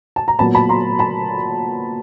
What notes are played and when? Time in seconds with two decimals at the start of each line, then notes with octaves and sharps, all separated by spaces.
0.16 A5
0.28 A#5
0.39 A#2 F#3 B3 A5 B5
0.55 A5 B5
0.69 A#5 C6
0.99 A5 B5